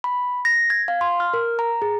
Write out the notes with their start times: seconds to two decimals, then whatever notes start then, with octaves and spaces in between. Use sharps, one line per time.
0.04 B5
0.45 A#6
0.70 G#6
0.88 F5
1.01 C6
1.20 F6
1.34 A#4
1.59 A#5
1.82 G#4